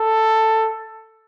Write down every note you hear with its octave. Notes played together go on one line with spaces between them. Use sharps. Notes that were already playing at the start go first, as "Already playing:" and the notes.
Already playing: A4